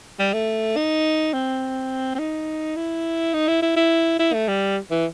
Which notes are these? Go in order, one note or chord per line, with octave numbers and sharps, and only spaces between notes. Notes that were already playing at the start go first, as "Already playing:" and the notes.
G3
A3
D#4
C4
C4
D#4
E4
D#4
E4
E4
E4
E4
A3
G3
E3